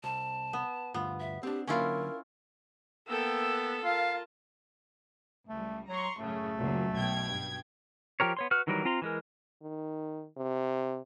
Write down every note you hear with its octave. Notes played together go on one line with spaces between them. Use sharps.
C2 A5
B3
D2 G2 B3 F4
E5
C4 D4 G4
D3 F#3 A#3 C#4 E4 F4 A#4
A#3 B3 A4 G5 E6
F4 A#4 F5 A5
C#2 G3 A3
F#3 A#5 C6 C#6
F#2 A2 C#3 A3
F#1 C#2 F#2 A#2 F#3
B1 B2 G5 G#6
G2
F3 G4 A#4 C#5
B3 C#5 C6
F#4 B4 F6
D#3 E3 F#3 G3 A#4
C4 F4 A#5 C6
E3 G#3 A#4
D#3
C3